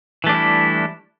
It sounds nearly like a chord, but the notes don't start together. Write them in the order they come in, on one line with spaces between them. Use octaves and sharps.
E3 A3 D4 G3 E4